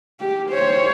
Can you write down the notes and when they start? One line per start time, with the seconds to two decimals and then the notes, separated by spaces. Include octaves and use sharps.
0.20 G4
0.50 C5 C#5